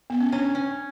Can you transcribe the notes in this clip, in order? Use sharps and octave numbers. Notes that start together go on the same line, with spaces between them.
B3
C#4
C#4 D4
C#4